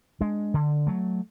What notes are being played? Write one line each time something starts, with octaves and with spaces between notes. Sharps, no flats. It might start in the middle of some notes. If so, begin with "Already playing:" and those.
G#3 D4
D3
F#3 A3